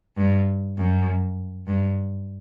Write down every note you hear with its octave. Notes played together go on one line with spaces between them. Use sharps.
G2
F#2
G2